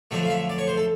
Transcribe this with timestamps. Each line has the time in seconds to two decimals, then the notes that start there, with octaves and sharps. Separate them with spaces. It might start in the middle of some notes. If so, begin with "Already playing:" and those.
0.11 F2 D3 F#3 A3 E5
0.25 F5
0.30 E5
0.49 D5
0.58 C#5
0.67 C5
0.77 A4